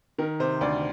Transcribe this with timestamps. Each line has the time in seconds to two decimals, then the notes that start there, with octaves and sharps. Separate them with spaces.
0.18 D#3 A#4
0.40 C3 C5
0.61 D2 D5